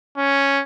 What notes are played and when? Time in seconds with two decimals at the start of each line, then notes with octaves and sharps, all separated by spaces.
0.17 C#4